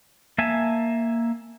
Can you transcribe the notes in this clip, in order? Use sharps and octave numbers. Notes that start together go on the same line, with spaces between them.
A#3 E5 G#5 A5